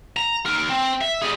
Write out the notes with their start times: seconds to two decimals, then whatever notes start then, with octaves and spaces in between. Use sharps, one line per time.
0.17 A#5
0.46 D#2 A#4
0.69 C4
1.01 E5
1.22 G3 G#4